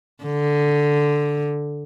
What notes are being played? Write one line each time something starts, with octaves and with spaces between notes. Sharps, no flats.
D3